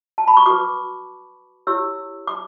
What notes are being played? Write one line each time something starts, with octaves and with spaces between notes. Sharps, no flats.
A5
B5
C#6
F#4 B4 D6
E4 G4 C#5 E6
D6